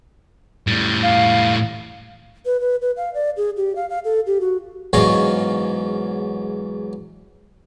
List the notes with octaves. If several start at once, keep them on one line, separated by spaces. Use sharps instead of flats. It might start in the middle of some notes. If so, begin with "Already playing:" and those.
A2 G3
F5
B4
B4
B4
F5
D5
G#4
G4
F5
F5
A4
G4
F#4
E2 G#2 F#3 C#5 D#5 F5